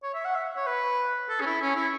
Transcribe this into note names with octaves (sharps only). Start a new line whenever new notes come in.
C#5
E5
F#5
E5
C#5
B4
A4
C#4
E4
C#4
E4